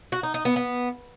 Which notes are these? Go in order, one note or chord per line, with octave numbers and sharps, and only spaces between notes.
F#4
D#4
D#4
B3
B3